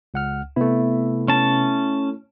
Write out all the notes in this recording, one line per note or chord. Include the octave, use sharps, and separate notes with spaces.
C#2 F#5 F6
C3 A3 B3 E4
C#4 A5